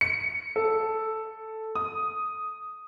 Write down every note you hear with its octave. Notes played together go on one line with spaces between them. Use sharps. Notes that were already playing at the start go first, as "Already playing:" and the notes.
C#7
A4
D#6